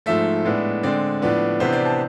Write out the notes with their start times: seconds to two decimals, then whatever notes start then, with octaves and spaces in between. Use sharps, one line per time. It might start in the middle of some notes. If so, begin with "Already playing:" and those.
0.06 G#2 F3 A3 E5
0.45 A2 G#3 B3 D4
0.83 D3 G#3 C4 D5
1.22 A2 F3 B3 D4
1.60 C3 E3 B3 D4 C5
1.73 D5
1.85 A5